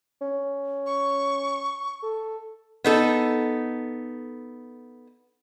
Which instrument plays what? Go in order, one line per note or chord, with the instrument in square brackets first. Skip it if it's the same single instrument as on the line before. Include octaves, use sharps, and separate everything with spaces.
[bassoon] C#4
[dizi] C#6
[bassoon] A4
[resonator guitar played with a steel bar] B3 D#4 A4